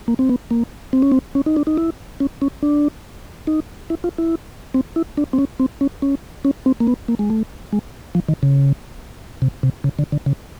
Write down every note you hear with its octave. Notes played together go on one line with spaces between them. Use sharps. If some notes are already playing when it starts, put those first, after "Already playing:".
A#3
C4
B3
A#3
C4
C#4
C4
C#4
D#4
D4
D#4
E4
C#4
C#4
D4
D#4
E4
F4
E4
C4
E4
D4
C4
C#4
C4
C#4
C#4
C#4
C4
A#3
B3
A#3
G#3
A3
G#3
F3
D#3
C#3
C3
C3
C#3
D3
D3
C#3